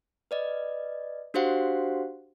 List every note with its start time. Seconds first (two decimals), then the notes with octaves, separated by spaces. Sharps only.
0.31 B4 D5 D#5
1.34 D4 F#4 G4 C5 F5 F#5